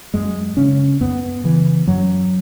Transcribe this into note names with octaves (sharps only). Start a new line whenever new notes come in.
F#2 G#3
C#3 C#4
F#2 B3
C#3 E3
F#2 F#3